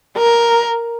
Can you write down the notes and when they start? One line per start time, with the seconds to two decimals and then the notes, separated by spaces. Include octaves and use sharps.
0.17 A#4